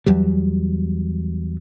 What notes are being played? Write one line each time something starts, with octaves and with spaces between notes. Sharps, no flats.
E2 F#3 G3